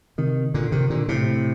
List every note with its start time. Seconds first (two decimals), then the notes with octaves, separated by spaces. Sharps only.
0.18 C3 D#3
0.54 A#2 D3
0.72 C3 D#3
0.90 A#2 D3
1.08 A2 C3